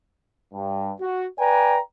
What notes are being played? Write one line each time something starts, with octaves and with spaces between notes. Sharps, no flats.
G2
F#4
B4 D5 G5 G#5 A#5